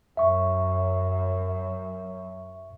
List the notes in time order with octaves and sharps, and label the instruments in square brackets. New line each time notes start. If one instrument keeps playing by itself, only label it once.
[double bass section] F#2 [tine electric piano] E5 C#6